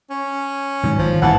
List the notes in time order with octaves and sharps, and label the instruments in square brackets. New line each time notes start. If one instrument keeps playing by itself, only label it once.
[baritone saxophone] C#4
[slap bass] G#2 D#3 F#3
[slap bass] G#1 [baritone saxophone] F3
[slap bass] A1 G2 [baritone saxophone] E3 [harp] F#5 A5